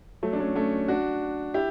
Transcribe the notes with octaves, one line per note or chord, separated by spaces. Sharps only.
F#3 A3
D4
A3 C#4
A3 C#4
D4 F#4
E4 G4